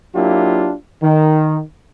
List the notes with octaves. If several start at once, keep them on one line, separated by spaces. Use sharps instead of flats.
F#3 A#3 D4 E4 F4 G4
D#3